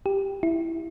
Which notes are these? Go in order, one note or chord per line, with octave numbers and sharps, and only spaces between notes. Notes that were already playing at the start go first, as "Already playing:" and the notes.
G4
E4